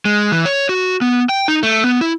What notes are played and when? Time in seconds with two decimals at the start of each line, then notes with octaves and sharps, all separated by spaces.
0.05 G#3
0.32 E3
0.45 C#5
0.69 F#4
1.01 B3
1.29 G5
1.48 D#4
1.63 A3
1.84 B3
2.01 E4